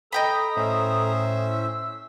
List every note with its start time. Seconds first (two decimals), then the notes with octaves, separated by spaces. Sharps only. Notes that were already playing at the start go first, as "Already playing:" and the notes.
0.12 A4 D#5 G5 A#5 B5 D#6
0.57 A2 C#4 C5 E5
1.51 E6